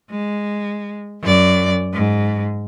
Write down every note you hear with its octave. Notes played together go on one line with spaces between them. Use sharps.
G#3
F#2 D5
G#2